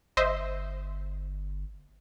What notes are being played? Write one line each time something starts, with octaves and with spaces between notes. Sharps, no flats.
G1 C5 D#5 E5